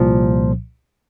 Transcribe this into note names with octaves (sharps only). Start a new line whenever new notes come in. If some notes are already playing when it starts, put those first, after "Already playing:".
Already playing: C2 A#2 F3